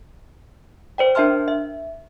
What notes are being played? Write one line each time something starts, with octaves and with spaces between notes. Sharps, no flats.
C5 D5 G5
D4 A#4 E5 A5 C6 F6
E5